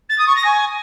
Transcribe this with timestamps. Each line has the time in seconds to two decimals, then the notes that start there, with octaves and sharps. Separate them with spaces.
0.09 A6
0.18 D#6
0.27 C#6
0.36 A#6
0.44 G#5